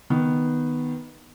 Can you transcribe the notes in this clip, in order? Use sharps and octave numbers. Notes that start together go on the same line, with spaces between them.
D#3 B3